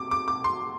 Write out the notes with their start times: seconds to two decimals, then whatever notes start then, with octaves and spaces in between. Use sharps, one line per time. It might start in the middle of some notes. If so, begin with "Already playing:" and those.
Already playing: C3 D6
0.11 D6
0.28 D6
0.44 C6